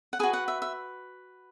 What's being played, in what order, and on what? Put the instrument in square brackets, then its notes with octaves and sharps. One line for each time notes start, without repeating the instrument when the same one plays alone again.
[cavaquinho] F#5
F#4 G#4 B4 G#5
F#5
E5
E5